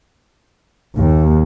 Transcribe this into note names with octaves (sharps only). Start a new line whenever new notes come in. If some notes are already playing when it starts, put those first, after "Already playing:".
D#2